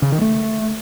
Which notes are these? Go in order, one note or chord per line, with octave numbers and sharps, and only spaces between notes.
C#3
D#3
A3